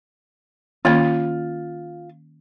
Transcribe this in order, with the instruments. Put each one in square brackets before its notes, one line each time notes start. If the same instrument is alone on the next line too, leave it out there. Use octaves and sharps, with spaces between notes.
[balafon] D#3 A#3 C#4 [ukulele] F4